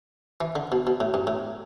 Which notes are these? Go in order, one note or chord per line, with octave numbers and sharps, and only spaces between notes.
E3
D3
B2
B2
A2
G2
A2